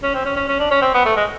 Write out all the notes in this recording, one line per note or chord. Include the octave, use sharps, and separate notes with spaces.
C#4
C4
C#4
C#4
C#4
D4
C#4
C4
B3
A3
G#3